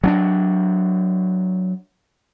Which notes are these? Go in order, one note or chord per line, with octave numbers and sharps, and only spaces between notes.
F#3 C#4 D4